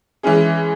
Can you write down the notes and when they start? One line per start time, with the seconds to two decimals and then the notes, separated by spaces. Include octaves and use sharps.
0.23 E3 G#3 C#4 G#4